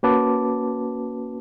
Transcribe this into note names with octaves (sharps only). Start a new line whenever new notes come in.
A#3 C#4 F#4 B4 A5 D6